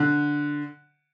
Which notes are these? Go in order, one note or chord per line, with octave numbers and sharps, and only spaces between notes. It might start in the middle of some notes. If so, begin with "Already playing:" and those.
Already playing: D3